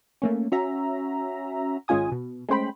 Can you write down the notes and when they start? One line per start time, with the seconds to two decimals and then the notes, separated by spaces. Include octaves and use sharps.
0.22 A3 A#3 C#4
0.52 C#4 F#4 E5 A#5
1.88 G#1 G#3 C#4 F4 G#5 D#6
2.12 B2
2.49 G#3 A3 C#4 C5 G5 B5